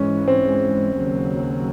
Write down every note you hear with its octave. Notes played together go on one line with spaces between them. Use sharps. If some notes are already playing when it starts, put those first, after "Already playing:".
Already playing: G#2 E3 G#3 C#4
C4
D#2 C#3 F#3